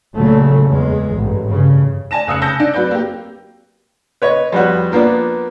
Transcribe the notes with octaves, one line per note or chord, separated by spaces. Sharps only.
C#2 A#2 C#3 F#3 A3
E2 G#3
A1 G2
G2 C#3
D5 G#5 A5 A#6 E7
F1 C#3 D#6 E6 F#6 C#7
G#5 A5 E6 G6 A#6
D4
F#3 C4 B4 D5 G6
A#3 G4
B4 C#5 D#5
F2 G3 B3 F#4
F3 A#3 B3 D4